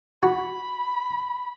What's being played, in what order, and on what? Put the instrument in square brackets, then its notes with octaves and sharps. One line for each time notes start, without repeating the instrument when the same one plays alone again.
[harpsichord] F#4 [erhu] B5